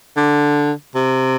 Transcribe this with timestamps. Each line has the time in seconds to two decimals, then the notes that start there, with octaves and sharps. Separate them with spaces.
0.16 D3
0.95 C3